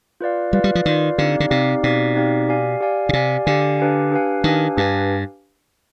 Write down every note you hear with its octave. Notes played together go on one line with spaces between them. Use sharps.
F4 B4 D5 F5
G3 F4 B4 D5 F5
G3
F3
D#3 F4 B4 D5 F5
D3 C4 D#4 G4 D5 F5
D3
C3 C4 D#4 G4 D5 F5
B2 C4 D#4 G4 D5 F5
C4 D#4 G4 D5 F5
G4 D5 F5 G#5
G4 D5 F5 G#5
B2
C3 G4 D5 F5 G#5
D3 G4 D5 F5 G#5
D4 G4 B4 F5 G#5
D4 G4 B4 F5 G#5
D#3 D4 G4 B4 F5 G#5
G2 D4 G4 B4 F5 G#5